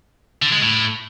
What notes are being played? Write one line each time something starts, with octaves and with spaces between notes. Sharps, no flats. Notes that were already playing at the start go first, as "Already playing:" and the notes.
D3
G#3
A2